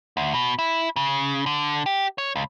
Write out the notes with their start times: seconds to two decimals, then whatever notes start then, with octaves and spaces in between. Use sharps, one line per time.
0.17 D2
0.34 B2
0.59 E4
0.96 C#3
1.46 D3
1.86 G4
2.18 C#5
2.36 C#2